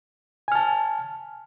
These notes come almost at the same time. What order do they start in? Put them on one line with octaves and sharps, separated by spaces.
G#5 F6 A5